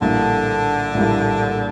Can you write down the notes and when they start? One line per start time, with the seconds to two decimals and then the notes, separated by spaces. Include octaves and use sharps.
0.01 A#1 A2 D3 G3 A#3
0.94 A#1 A2 G3 A#3